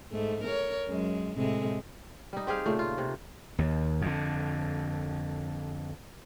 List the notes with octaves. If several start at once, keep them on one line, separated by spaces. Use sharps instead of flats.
G#2 A3
A#4 C#5
F#2 G#3
A2 C3 G#3
G3 D#4
C4 G4 G#4 F5
A#2 C#3 A3
F4
C3
D#2
F2 D3